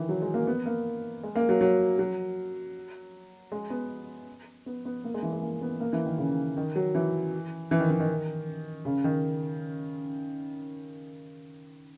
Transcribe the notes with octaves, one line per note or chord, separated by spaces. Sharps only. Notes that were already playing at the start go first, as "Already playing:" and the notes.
Already playing: D#3 E3
F#3
G#3
A#3
B3
A#3
G#3
A#3
F#3
F#3
F#3
G#3
B3
B3
B3
A#3
G#3
E3
G#3
A#3
B3
A#3
E3
D#3
C#3
D#3
F#3
E3
E3
D#3
E3
D#3
C#3
D#3